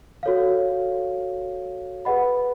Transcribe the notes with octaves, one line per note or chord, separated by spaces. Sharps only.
F#4 A4 C#5 F5
G#4 B4 D#5 F#5 B5